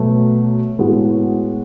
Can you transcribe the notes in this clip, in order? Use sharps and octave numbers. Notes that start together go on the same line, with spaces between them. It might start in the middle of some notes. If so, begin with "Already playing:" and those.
Already playing: B2 F#3 A3
A2 G#3 B3 F#4